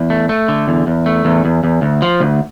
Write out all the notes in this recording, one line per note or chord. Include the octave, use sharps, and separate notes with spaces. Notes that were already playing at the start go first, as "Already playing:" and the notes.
Already playing: E2
A3
A3
D3
E2
E2
A3
E2
E2
E2
D2
F3
D2